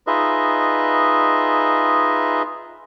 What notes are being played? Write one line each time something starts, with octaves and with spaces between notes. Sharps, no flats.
D#4 F4 G#4 B4 D#5 E5